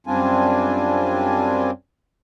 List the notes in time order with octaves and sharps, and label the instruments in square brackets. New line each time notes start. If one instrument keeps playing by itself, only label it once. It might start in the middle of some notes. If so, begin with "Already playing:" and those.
[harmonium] F#2 G3 C4 D4 F4 G#5